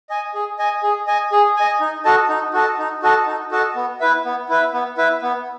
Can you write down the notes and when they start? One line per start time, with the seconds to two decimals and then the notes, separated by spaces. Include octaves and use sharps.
0.10 D#5 G#5
0.34 G#4
0.59 D#5 G#5
0.83 G#4
1.07 D#5 G#5
1.32 G#4
1.56 D#5 G#5
1.80 D#4
2.05 F#4 A4 D#5 A5
2.29 D#4
2.54 F#4 A4 D#5 A5
2.78 D#4
3.03 F#4 A4 D#5 A5
3.27 D#4
3.52 F#4 A4 D#5 A5
3.76 B3
4.00 E4 B4 E5
4.25 B3
4.49 E4 B4 E5
4.73 B3
4.98 E4 B4 E5
5.22 B3